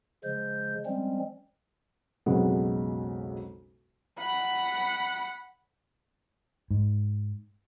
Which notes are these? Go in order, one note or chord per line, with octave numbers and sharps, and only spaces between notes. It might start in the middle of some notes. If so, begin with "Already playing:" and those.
C#3 F3 G#3 C5 G6
F3 G3 G#3 C4 C#4
B1 F2 C#3 F#3 G#3 B3
F#5 B5
G#2